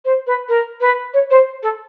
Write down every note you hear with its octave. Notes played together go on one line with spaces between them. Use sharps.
C5
B4
A#4
B4
C#5
C5
A4